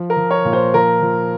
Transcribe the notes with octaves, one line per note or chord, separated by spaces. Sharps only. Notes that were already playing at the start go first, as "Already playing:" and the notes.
Already playing: F3
A#4
F3
C#5
A#2
C5
F3 A#4
F3